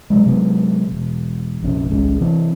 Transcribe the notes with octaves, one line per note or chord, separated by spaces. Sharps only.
C3 F#3 G#3
C3 F#3 G#3 B3
E1
A#1 F2 C3 C#4
D#1 G#1 C#2 C#3
C3 E3 C4